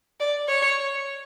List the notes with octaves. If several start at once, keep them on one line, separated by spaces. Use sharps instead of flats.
D5
C#5